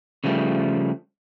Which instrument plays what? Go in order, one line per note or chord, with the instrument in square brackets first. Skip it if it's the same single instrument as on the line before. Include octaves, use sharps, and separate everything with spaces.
[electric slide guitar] C#3 F3 G3 A3